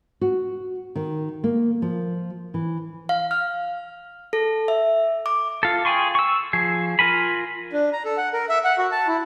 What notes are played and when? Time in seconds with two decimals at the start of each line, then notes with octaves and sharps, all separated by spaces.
0.21 F#4
0.96 D#3
1.44 A#3
1.82 F3
2.54 E3
3.09 F5
3.31 F6
4.33 A4
4.68 E5
5.26 D6
5.63 F4 A4
5.85 G#4 G5 G#5 C6 C#6
6.15 C#6 E6
6.53 F3 G#4
6.99 F4 A#4 G#5 B5
7.72 D4
7.93 A#5
8.05 A4
8.17 F#5
8.33 A#4
8.49 E5
8.64 F#5
8.78 F#4
8.92 A5
9.07 E4